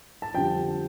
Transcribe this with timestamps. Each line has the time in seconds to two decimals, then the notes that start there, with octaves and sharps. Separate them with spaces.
0.22 A5
0.34 F2 D3 G3 G5